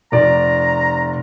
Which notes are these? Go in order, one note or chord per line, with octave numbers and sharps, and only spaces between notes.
F1 D5 A#5